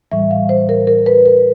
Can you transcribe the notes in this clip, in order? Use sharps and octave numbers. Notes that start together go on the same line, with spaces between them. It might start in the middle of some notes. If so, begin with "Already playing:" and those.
A2 E3 G3 E5
F5
C5
A#4
A#4
B4
A#4